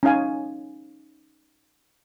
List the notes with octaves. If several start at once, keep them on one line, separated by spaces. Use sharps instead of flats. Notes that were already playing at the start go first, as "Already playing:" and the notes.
C#4 D#4 F5 G#5